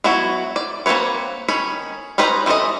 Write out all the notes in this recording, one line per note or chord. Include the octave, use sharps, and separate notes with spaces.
F#3 B3 E4 F#4
D5
A#3 C4 D#4 B4 C#5
D#3 C#4 B5
C#4 D#4 B4 C5 A#5
E3 C4 D#4 A4 D#5